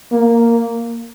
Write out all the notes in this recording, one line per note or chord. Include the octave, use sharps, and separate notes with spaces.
A#3